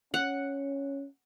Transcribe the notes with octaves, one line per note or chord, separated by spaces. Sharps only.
C#4 F#5